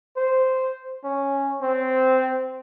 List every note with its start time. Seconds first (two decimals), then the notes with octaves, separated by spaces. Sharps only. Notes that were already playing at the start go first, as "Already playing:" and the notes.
0.17 C5
1.04 C#4
1.62 C4